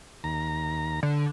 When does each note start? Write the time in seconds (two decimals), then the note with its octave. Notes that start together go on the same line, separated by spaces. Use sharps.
0.24 D#2 A#5
1.03 D3